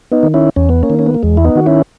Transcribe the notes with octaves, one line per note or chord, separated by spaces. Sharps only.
B3 D#4
D#3
C#4 E4
E2 C#4
B3
A#3 C#4
D#3
C#4
B3
A#3
E2 G#3
E4
B3 D#4
D#3 F#4
C#4 E4